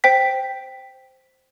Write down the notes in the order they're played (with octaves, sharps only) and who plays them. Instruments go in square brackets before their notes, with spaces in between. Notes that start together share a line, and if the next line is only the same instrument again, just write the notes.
[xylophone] C5 G5 B6